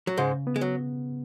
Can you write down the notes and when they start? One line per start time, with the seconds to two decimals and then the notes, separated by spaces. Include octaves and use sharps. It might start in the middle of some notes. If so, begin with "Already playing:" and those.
0.07 F#3
0.17 G#2 C#3 G#3
0.47 B3
0.56 G#3
0.61 F#3